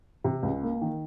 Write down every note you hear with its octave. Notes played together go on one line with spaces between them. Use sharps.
C3
C#2
A#3
D#3